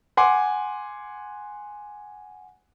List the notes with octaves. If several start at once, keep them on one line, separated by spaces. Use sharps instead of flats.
F#5 G#5 C6 D6